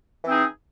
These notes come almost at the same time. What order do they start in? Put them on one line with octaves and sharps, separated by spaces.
E3 C4 D#4 G#4